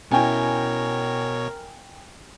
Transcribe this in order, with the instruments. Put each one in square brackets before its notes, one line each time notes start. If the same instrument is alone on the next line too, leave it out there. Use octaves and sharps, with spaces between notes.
[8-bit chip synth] B2 C#5 [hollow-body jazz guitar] C#4 E4 [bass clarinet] A#4 [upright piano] G5 G#5